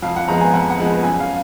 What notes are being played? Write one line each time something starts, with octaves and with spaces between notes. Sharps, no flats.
F2 F5
F#5
F3 G#3 B3 A#5
G#5
F2 F#5
F#5
F3 G#3 B3
F#2 G#5
F5